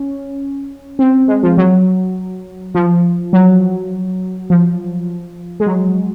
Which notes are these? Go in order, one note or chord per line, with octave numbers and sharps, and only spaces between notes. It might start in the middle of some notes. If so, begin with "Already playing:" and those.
Already playing: C#4
C4
G#3
F3
F#3
F3
F#3
F3
G#3
F#3